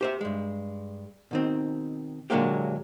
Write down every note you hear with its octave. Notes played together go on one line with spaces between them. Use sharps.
G4 C5 E5
G2 G#3
B2 D#3 C4
A#2 D3 F#3 G#3 A#3 G4